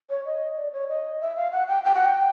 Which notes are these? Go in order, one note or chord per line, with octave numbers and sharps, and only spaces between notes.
C#5
D#5
D5
C#5
D#5
E5
F5
F#5
G5
G5
F#5
G5